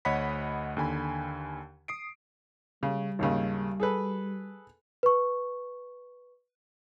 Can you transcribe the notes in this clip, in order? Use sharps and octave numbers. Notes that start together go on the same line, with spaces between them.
D2 C#5 D#5 F#5 B5 B6
D#2 D3 G#5 B5
D#6 C7 D7
C#3 G3
G#1 D#2 C#3
G#4 A4 B4
B4 C#6